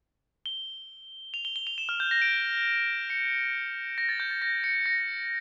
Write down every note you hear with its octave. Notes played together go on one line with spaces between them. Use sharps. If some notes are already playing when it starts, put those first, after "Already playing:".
G7
F7
G7
G7
F7
E7
F6
G6
A#6
D7
C#7
A#6
A6
G6
A6
A#6
C#7
A#6